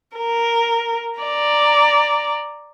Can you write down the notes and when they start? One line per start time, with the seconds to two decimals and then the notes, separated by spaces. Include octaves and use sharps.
0.17 A#4
1.20 D5 A#5